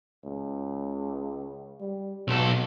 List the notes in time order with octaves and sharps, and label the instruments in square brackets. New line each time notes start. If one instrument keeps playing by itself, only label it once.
[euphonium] C#2
G3
[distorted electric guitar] B1 A4 [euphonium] B2